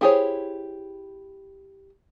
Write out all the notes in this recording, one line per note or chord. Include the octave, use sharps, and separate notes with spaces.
E4 G4 G#4 C5 C#5